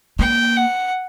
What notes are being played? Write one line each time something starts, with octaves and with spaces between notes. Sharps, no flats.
A#3 G5
F#5